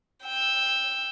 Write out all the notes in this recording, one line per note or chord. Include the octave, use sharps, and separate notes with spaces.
G5 E6